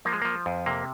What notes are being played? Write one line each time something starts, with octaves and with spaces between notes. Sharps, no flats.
F3 A#3
G#3
F3 A#3
F2
C3 A#3